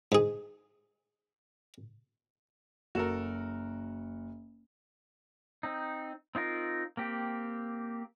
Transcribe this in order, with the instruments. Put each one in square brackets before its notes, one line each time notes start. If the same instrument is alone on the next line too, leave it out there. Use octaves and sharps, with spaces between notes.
[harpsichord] G#2 G#4
[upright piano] F#1 E7 [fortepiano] F#4 A4 A#4
[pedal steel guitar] C4 D#4
C4 D#4 F4 A#4
A#3 C4 G4